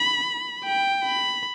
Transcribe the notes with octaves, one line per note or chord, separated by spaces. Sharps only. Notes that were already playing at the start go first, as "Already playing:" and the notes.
Already playing: B5
G5
B5